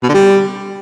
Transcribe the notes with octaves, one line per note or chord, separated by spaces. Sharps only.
B2
D3
G3